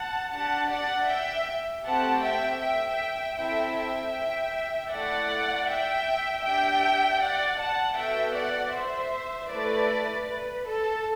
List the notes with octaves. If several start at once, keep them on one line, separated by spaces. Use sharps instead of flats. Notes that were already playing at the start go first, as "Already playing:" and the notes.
Already playing: F#5 A5
D4 G4 F#5 A5
D5 F#5
E5 G5
A3 C4 G4 F#5 A5
E5 G5
E5 G5
C4 E4 A4 E5 G5
E5 G5
A3 E4 A4 D5 F#5
E5 G5
D4 G4 E5 G5
D5 F#5
F#5 A5
B3 F#4 A4 E5 G5
D5 F#5
C5 E5
A3 E4 A4 B4 D5
B4
A4